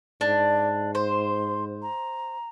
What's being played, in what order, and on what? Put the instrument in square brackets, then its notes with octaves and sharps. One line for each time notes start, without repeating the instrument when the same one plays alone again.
[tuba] G#2 [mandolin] D4 [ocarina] D5
[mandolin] C5 [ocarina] C6
[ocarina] A#5